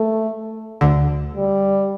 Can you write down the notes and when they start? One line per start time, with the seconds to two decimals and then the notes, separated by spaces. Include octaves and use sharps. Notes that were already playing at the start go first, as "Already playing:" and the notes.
Already playing: A3
0.81 D2 D3
1.35 G3